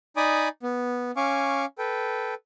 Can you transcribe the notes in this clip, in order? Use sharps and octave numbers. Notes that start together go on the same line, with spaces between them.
D#4 D5 G#5 B5 D6 D#6
B3
C#4 F5 G#5 C#6 D6
A4 B4 G5